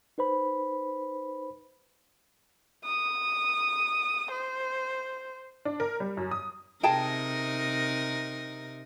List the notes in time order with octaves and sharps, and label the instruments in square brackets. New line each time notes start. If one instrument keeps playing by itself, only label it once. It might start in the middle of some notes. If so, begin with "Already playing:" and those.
[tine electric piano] D#4 B4 C5 B5
[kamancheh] D#6
C5
[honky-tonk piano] D4
A#4
G3
F#2
D#6
[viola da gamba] C3 D#4 A#4 [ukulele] G#4 G5 A5